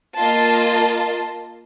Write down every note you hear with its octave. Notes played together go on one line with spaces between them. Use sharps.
A#3 F4 D#5 A5 C6 A6